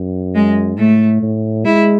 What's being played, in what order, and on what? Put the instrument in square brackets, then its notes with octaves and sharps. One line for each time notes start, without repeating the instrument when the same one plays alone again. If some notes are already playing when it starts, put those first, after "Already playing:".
Already playing: [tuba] F#2
[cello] G#3
[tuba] A2 [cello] A3
[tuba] A2
[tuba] G#3 [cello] E4